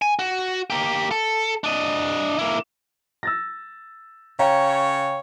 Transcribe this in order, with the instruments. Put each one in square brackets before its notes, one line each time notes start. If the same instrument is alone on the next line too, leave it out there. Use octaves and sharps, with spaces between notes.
[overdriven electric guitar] G#5
F#4
A#3 G4
A4
D4 D#5
A#3 E4
[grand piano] E6 A6 A#6
[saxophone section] C#3 C#5 [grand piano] F5 G5 A#5